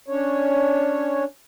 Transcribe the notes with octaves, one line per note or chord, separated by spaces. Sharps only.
C#4 D4 C#5